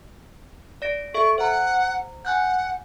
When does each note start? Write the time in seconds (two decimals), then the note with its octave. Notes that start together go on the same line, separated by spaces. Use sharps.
0.82 D5 A#6 D7
1.14 A4 E5 C#6 D7
1.38 C5 F#5 A#5
2.25 F#5 G#5 F#6 G6